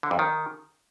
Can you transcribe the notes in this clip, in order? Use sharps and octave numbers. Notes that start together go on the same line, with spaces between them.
D3
F2
D#3